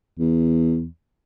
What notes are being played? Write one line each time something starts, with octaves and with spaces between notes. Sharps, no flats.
E2